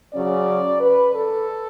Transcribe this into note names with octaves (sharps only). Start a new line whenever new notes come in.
C#3 F#3 C#4 D5
B4
A4